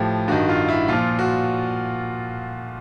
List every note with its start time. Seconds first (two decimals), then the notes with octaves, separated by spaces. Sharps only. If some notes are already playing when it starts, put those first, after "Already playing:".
Already playing: A2 F3 G4
0.28 G2 D#3 F#4
0.48 F4
0.68 E4
0.88 A#2 F3 F4
1.19 F#4